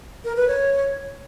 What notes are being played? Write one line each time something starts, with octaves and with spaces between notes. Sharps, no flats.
A#4
B4
C#5